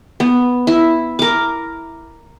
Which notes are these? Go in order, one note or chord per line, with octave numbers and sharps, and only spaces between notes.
B3
E4
A#4 D6